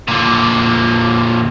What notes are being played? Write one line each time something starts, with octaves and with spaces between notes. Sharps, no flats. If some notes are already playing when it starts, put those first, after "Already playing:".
A#2 D3